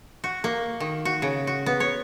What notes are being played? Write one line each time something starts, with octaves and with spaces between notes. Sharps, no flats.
F#4
A#3
D#3
F#4
C#3
F#4
B3
C#5